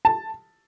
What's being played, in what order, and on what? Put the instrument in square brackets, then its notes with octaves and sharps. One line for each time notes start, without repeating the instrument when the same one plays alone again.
[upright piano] A5